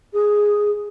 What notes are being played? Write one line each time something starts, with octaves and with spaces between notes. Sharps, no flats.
G#4